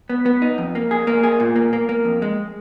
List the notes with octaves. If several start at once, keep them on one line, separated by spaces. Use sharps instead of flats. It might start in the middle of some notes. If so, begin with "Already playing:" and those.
B3
B3
D#4
F2
A#3
G#4
A#3
G#4
A#2
A#3
A#3
A#3
F2
G#3